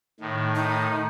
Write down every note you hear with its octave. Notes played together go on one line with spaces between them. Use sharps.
A2 D#3
D#4